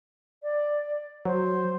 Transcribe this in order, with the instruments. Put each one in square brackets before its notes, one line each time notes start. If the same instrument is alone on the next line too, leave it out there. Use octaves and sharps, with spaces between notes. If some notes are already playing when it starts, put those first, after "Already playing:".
[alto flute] D5
[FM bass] F#3 [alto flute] C5